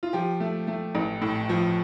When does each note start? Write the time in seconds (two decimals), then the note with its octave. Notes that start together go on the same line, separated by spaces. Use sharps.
0.03 F4
0.13 F3 G4
0.40 A3
0.67 A3
0.95 A1
1.22 A2
1.49 F3